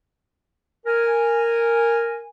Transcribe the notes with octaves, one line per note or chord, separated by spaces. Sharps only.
A#4 G#5